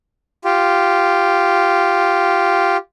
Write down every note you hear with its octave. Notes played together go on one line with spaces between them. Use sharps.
F4 G4